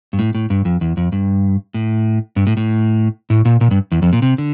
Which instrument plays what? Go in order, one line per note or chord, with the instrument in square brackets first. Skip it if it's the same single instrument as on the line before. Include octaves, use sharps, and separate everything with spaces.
[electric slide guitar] G2
A2
A2
G2
F2
E2
F2
G2
A2
G2
A2
A2
A2
A#2
A#2
G2
E2
F2
A#2
C3
D3